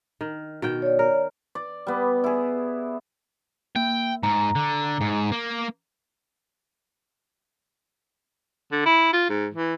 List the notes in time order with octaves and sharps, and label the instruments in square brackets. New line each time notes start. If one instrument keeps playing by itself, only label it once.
[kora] D#3
B2 D#3 G5
[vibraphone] C#5 D5
[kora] A#4
[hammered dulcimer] D5
G3 B3
E4 G#4
[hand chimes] A#3 [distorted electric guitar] G5
[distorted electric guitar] G#2 [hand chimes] A#5
[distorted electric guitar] D3
G#2
A#3
[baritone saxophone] D3
E4
F4
G#2
E3